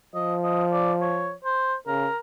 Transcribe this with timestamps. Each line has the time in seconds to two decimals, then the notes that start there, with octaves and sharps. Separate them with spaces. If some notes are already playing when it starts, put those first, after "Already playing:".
0.15 F3 D#5
0.44 D#5
0.72 D5
1.01 C#5
1.44 C5
1.87 C#3 A#4